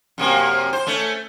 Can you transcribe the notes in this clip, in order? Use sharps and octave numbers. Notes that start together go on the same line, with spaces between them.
F#2 C3 A#3
C5
A3 C#4